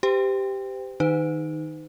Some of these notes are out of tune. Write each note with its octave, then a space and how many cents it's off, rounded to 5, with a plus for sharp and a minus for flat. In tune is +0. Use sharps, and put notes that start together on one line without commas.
G4 +0 C5 -35 G5 +15
D#3 +0 D#4 +0 B4 +45